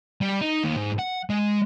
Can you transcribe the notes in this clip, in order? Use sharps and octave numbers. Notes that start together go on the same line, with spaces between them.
G3
D#4
D#2
G#2
F#5
G#3